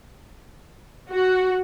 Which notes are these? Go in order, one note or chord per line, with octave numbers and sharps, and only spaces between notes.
F#4